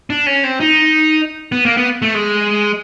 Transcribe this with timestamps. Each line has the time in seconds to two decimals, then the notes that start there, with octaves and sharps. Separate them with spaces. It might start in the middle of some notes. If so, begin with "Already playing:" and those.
0.10 D4
0.27 C#4
0.44 C4
0.60 D#4
1.52 B3
1.65 A#3
1.77 B3
2.02 A3
2.15 G#3